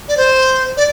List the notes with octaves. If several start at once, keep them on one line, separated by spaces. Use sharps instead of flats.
D5
C5
D5